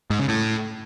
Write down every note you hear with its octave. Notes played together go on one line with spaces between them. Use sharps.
G#2
C#3
A2